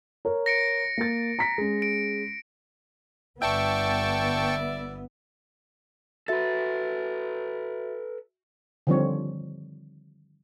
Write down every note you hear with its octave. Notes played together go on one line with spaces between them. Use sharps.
A#4 C#5
A#6 C#7 D7
A#3 A#4 A6
A#5 B6
G#3 C#4
D7
G1 B3 D5 E5 G5 A5 C#6
F#4 A4 B4 E5 A6
D3 D#3 F3 G3 C4 C#5